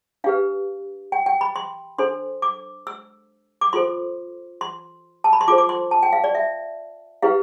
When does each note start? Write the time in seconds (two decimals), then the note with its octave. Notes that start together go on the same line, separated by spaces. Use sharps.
0.24 D4 G4 B4 F5
1.12 G5
1.26 G5
1.41 B5
1.56 C6
1.98 D4 A4 C5 C6
2.42 D6
2.87 E6
3.61 D6
3.73 F4 A4 C5 C6
4.61 C6
5.24 A5
5.33 B5
5.41 C6
5.48 F4 A4 C5 D6
5.58 D6
5.69 C6
5.91 A5
6.03 G5
6.13 F5
6.24 D5
6.35 E5
7.22 E4 G4 B4 F5